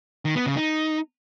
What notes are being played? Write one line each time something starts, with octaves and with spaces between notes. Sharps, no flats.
D#3
B3
C#3
D#4